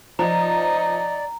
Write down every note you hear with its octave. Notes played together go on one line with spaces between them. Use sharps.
F3 D#4 D5 A#5